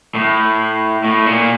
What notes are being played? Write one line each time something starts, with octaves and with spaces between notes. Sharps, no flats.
A2
A2
A#2